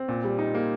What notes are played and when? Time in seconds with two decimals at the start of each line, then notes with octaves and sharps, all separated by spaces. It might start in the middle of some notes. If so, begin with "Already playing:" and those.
Already playing: C4
0.08 A#2
0.24 G3
0.38 D#4
0.55 A#3